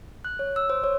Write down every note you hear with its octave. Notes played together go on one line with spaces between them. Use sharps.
F#6
C#5
E6
C5
C#5